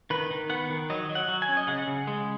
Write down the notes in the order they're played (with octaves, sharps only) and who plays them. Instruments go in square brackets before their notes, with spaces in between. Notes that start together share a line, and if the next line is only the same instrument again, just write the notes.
[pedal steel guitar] D#3 B4
D#3
B3 F#5
D#3
F#3 D#5
F#3
F#5
F#3
G#5
C#4
D#5
C#3 F#5
C#3
G#3